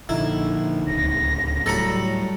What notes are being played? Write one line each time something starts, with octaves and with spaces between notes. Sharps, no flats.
A#1 D3 D#4 E4
D1 C#2 A#6
A2 F#3 G3 A4 A#5 B5 C#7